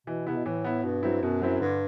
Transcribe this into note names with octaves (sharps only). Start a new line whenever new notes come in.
B2 E3
C3 B3 E4
B2
A2 E3
B3 E4
G2 B2
F#3 C4 E4
F#2 B2
F#3 C4 E4
G2 D3